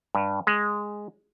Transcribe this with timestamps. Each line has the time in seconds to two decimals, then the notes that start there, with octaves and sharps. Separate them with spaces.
0.15 G2
0.47 G#3